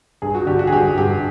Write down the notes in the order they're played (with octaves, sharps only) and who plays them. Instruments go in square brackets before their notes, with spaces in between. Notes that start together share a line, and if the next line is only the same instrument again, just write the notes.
[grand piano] G2 G#4
F#4
D3 G4
F#4
G#4
G2 G4
G2 G4